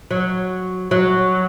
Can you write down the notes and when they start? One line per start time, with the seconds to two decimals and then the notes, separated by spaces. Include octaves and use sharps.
0.11 F#3
0.91 F#3